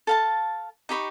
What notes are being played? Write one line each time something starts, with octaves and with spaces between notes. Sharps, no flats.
A4 F5 A5
D#4 G4 B5 C#6